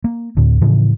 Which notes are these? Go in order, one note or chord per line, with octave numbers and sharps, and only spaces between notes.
A#3
D2 A2 D3
A2 C#3 E3 F3